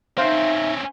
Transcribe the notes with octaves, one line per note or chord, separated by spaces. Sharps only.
C4 C#4 D#4 C5 E5 F5